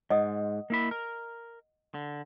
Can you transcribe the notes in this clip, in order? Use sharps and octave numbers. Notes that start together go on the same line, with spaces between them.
G#2 D#5 F#5 D#6
A#3 E4 B5
A#4
D3